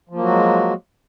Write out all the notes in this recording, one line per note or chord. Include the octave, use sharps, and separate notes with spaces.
F3 F#3 G#3 A#3 F#4